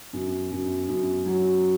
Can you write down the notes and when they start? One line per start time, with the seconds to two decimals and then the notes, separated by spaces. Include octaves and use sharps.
0.13 F#2
0.51 F#2
0.89 F#2
1.26 F#3